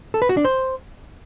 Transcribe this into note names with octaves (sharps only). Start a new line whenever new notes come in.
A4
B4
F#4
D4
C5